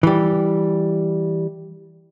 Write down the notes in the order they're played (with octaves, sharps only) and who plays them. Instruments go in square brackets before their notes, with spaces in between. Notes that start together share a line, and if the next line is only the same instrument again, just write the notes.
[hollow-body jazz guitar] E3 G3